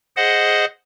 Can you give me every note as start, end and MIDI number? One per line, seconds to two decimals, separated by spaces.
0.16 0.65 68
0.16 0.65 72
0.16 0.65 75
0.16 0.65 78